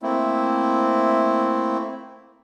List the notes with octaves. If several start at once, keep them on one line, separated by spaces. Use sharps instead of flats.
A3 A#3 C4 E4